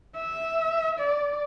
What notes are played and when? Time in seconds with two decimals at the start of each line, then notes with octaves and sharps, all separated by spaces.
0.15 E5
0.99 D5